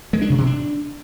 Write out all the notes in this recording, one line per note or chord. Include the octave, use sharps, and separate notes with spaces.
G#3
D4
C3
B2
D4